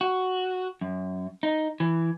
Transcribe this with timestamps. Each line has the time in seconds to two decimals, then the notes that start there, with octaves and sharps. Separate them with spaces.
0.01 F#4
0.81 F#2
1.43 D#4
1.80 E3